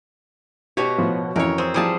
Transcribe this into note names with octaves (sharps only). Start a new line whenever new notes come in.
B2 F#4 G4 C#5
A2 F3 B3
F2 E3 C#4 A#4 C#5
C4 G#4
E3 F3 G3 G#4 A5